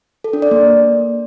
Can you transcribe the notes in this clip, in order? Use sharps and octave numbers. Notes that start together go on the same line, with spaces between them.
A4
D4
D5
A#3